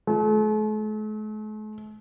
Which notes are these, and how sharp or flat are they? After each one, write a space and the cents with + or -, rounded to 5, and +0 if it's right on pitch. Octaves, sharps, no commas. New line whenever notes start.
A3 -45